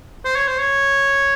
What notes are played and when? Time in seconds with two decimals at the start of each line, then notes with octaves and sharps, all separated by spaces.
0.25 C5
0.36 C#5
0.48 C5
0.59 C#5